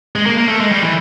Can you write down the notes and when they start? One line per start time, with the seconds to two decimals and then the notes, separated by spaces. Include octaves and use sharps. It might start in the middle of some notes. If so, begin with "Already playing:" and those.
0.16 G#3
0.26 A#3
0.38 A#3
0.49 A3
0.61 G#3
0.72 G3
0.82 E3